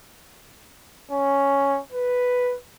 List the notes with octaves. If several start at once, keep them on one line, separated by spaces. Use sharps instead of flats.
C#4
B4